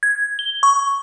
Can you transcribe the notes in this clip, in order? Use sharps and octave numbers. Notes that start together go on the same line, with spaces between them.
G#6
G7
C#6